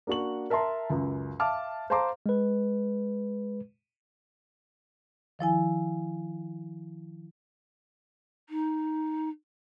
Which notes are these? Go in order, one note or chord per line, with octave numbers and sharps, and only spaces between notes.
A#3 D4 F#4 C#6 F#7
A#4 E5 A5 A#5 C6
C#2 F#2
E5 F5 A5 D6 F6
C5 F5 A5 A#5 C6 D6
G#3 B4
D#3 F3 E4 G#5
D#4